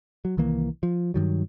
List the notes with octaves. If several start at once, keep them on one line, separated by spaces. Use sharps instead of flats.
F#3
C2 D#3 E3 A#3
F3
G2 D#3 F#3